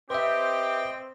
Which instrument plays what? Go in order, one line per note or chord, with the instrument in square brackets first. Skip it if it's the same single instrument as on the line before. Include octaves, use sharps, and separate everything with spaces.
[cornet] C4 [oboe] G4 [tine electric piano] B4 E5 [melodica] D#5 G5 C6